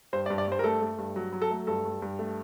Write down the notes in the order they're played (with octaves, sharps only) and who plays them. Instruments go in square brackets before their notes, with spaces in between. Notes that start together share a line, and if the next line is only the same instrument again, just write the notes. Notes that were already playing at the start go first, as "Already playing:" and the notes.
[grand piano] G2 C5
D5
G2
D5
G2 C5
A#4
A3 A4
A3
G2
F#3
F#3
A4
A3
G2 A4
G2
G2
A3